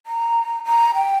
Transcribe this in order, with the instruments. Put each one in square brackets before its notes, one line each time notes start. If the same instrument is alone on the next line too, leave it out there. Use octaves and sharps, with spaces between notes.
[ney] A#5
A#5
G5